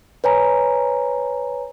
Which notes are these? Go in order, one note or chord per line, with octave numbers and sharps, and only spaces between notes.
B4 C#5 G#5 A#5